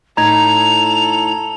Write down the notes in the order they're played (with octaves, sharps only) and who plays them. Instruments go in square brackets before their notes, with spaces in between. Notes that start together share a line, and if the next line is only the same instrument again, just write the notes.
[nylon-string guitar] A2 D#4 [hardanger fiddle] A4 [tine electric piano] A#5 G#6 [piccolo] F7